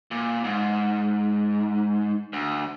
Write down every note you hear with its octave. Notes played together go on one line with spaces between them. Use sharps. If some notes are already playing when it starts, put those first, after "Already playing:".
A#2
G#2
D2